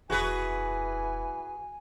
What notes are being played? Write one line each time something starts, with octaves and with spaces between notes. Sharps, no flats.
E1 F#2 E3 F#4 G#4 B4 G#5